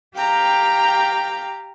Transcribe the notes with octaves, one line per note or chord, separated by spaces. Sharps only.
G4 F5 G5 A#5